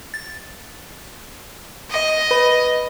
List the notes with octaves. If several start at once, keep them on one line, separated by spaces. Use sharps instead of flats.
A6
D#5
B4 B5